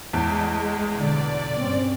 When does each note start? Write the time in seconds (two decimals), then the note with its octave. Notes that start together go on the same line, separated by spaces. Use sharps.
0.13 E2 A2 G#3 A5
0.96 B2 D3 D5
1.57 G2 C4 C#4